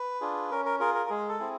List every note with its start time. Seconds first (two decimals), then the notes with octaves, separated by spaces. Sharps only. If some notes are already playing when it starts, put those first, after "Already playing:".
Already playing: B4
0.21 D4 F4 G#4
0.51 C#4 A#4
0.65 A#4
0.80 F4 G#4 A#4
0.95 A#4
1.10 G#3 G#4
1.29 A4
1.39 C4 E4 G#4